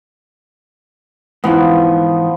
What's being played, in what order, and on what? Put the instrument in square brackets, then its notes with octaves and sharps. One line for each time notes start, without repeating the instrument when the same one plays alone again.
[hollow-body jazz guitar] G#2 E3 [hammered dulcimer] F3 B3